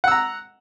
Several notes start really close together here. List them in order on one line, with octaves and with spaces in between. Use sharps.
F#5 E6 A#5